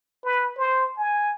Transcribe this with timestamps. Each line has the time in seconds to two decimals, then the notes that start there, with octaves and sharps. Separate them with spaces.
0.25 B4
0.57 C5
0.97 G#5